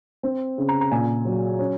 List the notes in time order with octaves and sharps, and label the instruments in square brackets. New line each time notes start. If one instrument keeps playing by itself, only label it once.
[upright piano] C4
C#3
A#5
A#5
A#2 G#5
F#3
C#4